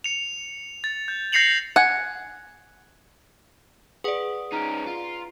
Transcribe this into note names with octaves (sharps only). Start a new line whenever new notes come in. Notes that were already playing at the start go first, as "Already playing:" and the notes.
C#7 F7
A6
G6
G6 A#6 C7 C#7 F7 F#7
F#5 G#5
G#4 B4 D5 F#5 D#6
C#4 D#4 A#5 F6 D7
F4